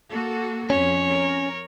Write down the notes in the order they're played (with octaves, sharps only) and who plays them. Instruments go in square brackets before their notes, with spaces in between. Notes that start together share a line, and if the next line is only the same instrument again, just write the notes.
[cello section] A#3 F#4 A4
[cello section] F2 [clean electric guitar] C#4 [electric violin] C#5
[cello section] A#4